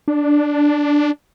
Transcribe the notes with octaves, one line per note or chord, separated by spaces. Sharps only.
D4